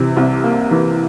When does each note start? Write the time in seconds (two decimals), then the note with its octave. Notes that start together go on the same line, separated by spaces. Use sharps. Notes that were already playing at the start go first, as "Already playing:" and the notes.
Already playing: C3 E3
0.17 C2
0.44 A#3
0.71 E3